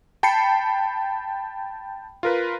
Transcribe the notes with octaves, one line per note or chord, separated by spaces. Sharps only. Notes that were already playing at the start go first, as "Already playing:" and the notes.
G5 A5 B5 C7 C#7
F4 A#4 B4